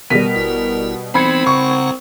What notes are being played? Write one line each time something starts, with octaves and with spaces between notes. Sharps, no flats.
B2 D#3 G3 A#4 B6
G#1 E4
E3 B3 C4 D#4 B5 G#6 C#7
C#3 F#5 A#5 C#6